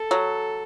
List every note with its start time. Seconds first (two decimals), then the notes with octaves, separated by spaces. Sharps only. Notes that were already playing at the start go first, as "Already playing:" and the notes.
Already playing: A4
0.11 F#3